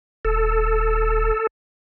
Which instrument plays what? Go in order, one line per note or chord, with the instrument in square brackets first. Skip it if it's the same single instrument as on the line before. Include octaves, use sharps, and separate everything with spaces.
[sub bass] D#1 [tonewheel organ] A4